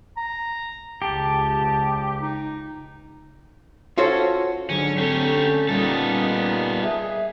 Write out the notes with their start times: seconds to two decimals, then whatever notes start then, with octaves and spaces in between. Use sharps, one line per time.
0.17 A#5
1.02 C#2 G4 A5
2.21 D#4
3.98 C#4 F4 F#4 A4 C5 C#5
4.70 G#2 D3 F#3 C#4
4.98 A3 C4 G4 C#5
5.35 C#4
5.69 A#2 G3 B3 D#4 A4
6.83 G#4 E5